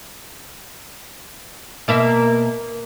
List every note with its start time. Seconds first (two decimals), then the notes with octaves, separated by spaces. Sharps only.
1.88 B2 A#3 E5